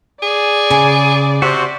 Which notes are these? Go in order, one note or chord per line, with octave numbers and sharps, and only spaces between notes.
G#4 D5
C#3 G#5
C3 F#4 C5